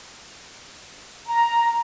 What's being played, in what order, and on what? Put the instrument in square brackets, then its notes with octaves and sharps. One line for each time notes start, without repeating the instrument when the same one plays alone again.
[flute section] A#5